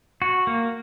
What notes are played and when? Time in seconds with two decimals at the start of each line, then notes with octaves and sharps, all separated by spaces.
0.22 F#4
0.47 A#3